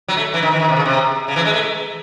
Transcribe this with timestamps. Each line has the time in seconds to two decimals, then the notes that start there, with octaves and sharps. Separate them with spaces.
0.08 F#3
0.17 A3
0.34 E3
0.42 D#3
0.51 E3
0.60 D#3
0.69 C3
0.76 C#3
0.85 C3
1.28 C#3
1.36 E3
1.45 G#3
1.54 A3